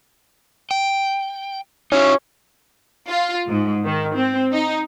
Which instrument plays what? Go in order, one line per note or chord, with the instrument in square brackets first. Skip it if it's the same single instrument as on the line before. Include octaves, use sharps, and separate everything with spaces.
[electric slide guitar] G5
[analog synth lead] C#4 [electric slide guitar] D#4 E4 F#4
[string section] F4
G#2
D#3
C4
D#4